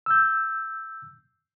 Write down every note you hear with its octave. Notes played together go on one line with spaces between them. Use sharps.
E6 G6